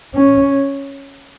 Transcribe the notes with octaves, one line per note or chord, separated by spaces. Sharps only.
C#4